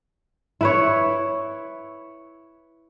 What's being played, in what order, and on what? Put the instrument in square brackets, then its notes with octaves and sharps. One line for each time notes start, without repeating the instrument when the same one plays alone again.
[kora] E4 B4 C#5